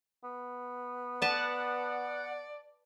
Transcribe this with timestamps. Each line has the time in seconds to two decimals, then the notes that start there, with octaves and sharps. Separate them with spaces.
0.24 B3
1.22 B4 D5 F#5 A5